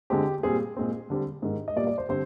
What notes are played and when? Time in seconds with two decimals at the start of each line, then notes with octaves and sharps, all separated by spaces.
0.10 D3 G#3 C4 G4
0.43 A#2 G3 C4 G#4
0.77 A#2 G#3 C4
1.10 D3 G3 C4
1.42 G#2 D#3 G#3
1.68 D#5
1.76 A#2 G3 A#3 D5
1.87 D5
1.98 C5
2.09 D3 G3 C4 C5